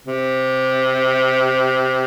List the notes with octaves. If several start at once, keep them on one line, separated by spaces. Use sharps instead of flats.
C3